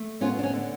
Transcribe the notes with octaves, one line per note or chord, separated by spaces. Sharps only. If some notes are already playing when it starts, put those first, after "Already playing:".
Already playing: A3
B3 C#4 F4
D4
C#4
D3